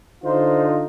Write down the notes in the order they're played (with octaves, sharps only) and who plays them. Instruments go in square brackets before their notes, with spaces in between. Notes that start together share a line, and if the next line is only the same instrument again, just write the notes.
[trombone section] D3 D#4 F4 [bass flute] C5